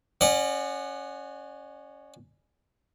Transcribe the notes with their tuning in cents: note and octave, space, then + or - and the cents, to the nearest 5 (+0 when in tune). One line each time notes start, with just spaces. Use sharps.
C#4 +0 D5 +45 F#5 +0